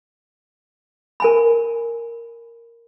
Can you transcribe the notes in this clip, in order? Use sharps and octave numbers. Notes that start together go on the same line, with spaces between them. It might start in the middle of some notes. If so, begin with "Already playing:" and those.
A#4 G#5 B5